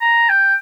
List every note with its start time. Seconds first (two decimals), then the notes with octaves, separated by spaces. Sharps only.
0.01 A#5
0.29 G5